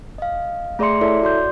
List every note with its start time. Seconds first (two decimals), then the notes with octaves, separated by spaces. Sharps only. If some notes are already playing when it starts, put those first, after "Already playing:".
0.18 D#5 F5
0.79 A3 G#4 D5 E5 C6 C#7
1.01 E4 A4 C#5 D5 E5
1.22 F#4 D5 C6 G6